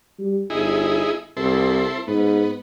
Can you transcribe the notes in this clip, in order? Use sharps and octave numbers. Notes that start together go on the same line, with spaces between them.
G3
G1 D#4 E4 G#4
C2 E4 A4 C5
G#2 B3